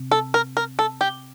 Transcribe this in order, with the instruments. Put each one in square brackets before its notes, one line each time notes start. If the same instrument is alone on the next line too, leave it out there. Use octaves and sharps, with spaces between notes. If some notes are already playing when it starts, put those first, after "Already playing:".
Already playing: [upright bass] C3
[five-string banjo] A4
A#4
A#4
A4
G4